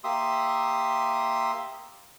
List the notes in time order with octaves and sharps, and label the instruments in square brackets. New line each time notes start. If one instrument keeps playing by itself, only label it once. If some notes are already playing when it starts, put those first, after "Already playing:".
[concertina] A#3 G4 E5 C6 D#6